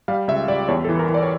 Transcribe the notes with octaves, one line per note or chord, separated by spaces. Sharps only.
G3 F5
C#2 E5
G3 D5
E2 C#5
A4
E3
A#4
E3
D5
C#5